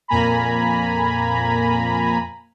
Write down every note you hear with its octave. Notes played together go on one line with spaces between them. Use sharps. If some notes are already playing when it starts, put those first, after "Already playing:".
F2 A#2 A#3 G#5 A#5 B5